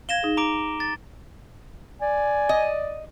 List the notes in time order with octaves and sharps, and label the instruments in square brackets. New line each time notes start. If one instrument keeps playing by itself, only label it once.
[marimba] F5 G#6 [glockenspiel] A#6 E7 G7
[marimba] D#4 G#4
[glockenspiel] A#5 D6 D7
A6
[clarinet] D5 [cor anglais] G#5
[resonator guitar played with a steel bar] D#5